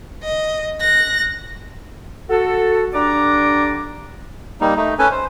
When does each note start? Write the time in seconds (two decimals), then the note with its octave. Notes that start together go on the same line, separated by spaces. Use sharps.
0.23 D#5
0.81 F#6 A#6
2.30 F#4 A4
2.94 D3 G3 D4 D5 A#5 D6
4.61 G3 A#3 D#4
4.76 A3 D#4
4.99 C#4 A4 B4 G#5
5.11 C5